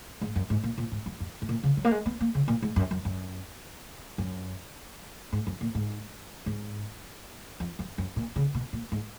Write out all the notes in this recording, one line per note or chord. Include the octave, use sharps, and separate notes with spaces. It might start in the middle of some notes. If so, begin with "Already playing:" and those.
G#2
F#2
G#2
A#2
A#2
G#2
F#2
F2
G#2
A#2
C#3
F#3
A#3
G#3
B3
A#3
C#3
A#2
G#2
F#2
F#2
F#2
F#2
G#2
F#2
A#2
G#2
G#2
F2
F#2
F#2
A#2
C#3
B2
A#2
G#2